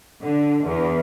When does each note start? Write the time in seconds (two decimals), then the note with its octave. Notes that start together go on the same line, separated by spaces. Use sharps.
0.21 D3
0.64 E2